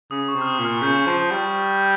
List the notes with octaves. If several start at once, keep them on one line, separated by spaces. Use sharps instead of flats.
C#3 D#6
C#6
C3
F6
D#6
A#2
F6
C#3 G6
F3
G3